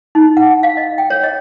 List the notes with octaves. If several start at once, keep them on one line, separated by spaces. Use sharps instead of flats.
D#4
F#5
F5
D#5
G5
C#5
D#5